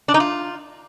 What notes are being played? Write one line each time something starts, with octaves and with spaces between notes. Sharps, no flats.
D4
D#4
F4